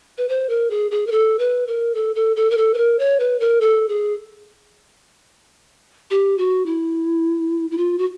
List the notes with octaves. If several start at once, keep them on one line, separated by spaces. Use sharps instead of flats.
B4
C5
A#4
G#4
G#4
A#4
A4
B4
A#4
A4
A4
A4
A#4
A4
B4
A#4
C#5
B4
A#4
A4
G#4
G4
F#4
E4
E4
F4
F#4